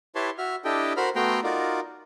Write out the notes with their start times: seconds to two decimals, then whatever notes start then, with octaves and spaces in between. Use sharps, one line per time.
0.15 E4 G4 B4 C#5 A5 C6
0.38 F#4 E5 F6
0.65 D4 E4 G4 A4 D#5 G5
0.97 F#4 A#4 C5 B5 F6
1.15 A3 B3 F#4 G5 A#5 C6
1.44 D#4 F4 F#4 A#4 D5